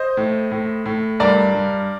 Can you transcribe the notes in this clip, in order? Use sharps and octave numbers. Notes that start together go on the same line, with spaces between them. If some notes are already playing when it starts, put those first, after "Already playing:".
Already playing: C5 D#5
A2
A2
A2
G2 A#4 D5
G2